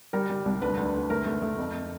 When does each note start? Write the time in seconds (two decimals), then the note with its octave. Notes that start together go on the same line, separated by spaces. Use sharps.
0.13 G3 A#4
0.30 G3
0.45 C2
0.61 D2 B4
0.77 D2
0.94 D2
1.10 A3 A#4
1.26 A3
1.42 A3
1.58 F2